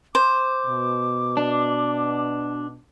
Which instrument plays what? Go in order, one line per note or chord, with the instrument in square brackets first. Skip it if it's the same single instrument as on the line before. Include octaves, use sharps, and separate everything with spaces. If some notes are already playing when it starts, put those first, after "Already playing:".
[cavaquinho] C5 [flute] D6
[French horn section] B2
[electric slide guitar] D4